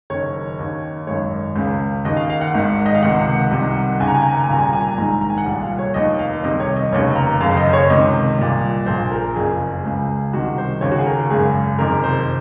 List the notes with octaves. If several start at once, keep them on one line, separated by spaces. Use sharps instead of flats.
F#1 F#2 D#3 C#5
D#2 D#3
G#1 F#2 D#3 C#5
C#2 C#3
D#2 D#3 D#5
F5
F5
F#5
G#1 G#2 D#3
D#5
F5
C#2 C3 D#3 F#5
C2 C3 D#3
D#2 C#3 G#5
A#5
G#5
A#5
G#5
A#5
G#5
C2 A#2 A#5
G#5
A#5
G#5
A#5
G#5
A#1 G#2 D#3 A#5
A#5
G#5
F#5
C2 A#2 F5
F5
C#5
F1 D#2 D#3 D#5
F5
C2 C3 D#3 D#5
C#5
D#5
F1 D#2 C#3 C#5
A#5
F#1 F#2 C#3 F5
F5
D#5
C5
C#5
C#2 C3 D#3 D#5
C2 A#2
A#1 A#2 C5
A#4
F#1 F2 C#3 G#4
C#2 C#3
C2 C3 D#3 F#4
C5
D#2 C#3 C#5
F#4
G#4
A#4
G#1 F#2 C#3 G#4
F#1 F2 C3 D#3 A#4
C5